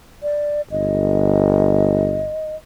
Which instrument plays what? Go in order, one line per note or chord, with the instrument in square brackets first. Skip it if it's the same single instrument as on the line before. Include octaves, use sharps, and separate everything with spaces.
[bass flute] D5
[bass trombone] G1 [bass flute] D#5